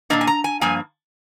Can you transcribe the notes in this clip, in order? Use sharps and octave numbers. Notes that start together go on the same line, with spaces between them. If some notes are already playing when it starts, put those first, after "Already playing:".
A#2 G3 A#3 D4 D#5
G#5
A#5
G#5
G2 F3 A#3 G#5